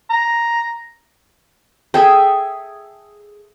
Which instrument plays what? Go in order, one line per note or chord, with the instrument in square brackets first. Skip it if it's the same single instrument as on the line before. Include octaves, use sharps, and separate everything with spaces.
[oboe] A#5
[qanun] G#4 A4 E5 [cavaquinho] G5